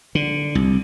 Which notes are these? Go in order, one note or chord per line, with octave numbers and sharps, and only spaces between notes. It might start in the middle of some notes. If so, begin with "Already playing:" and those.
D3
C2